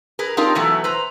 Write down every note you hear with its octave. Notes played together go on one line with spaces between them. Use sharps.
G#4 A#4 B4
C4 D4 D#4 F4 G4 A#4
B2 E3 F#3 A3 B3
B4 C5 A#5